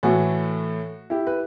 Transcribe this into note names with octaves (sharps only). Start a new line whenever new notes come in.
A2 E3 A3 F#4
E4 G4
B4